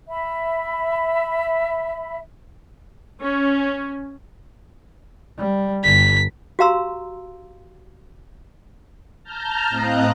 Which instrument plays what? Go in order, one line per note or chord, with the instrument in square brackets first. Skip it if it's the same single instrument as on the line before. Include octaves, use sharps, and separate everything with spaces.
[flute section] E5 B5
[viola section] C#4
[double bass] G3
[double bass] G1 [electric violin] B6
[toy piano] F#4 G4 F5 A#5 C6 E6
[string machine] A5 A#5 F6 G6
A2 C4 D#5 F5 A#5 F#6